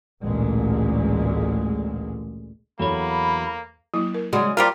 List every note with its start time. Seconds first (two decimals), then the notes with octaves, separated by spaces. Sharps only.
0.24 A1 D2 A#2 G#3
2.79 E2 F#3 A#3 A4 C#5 B5
3.94 F#3 A#3 E4
4.14 A#4
4.33 C#3 G#3 F#4 D5 F#5
4.57 G3 A#3 F4 A#4 C5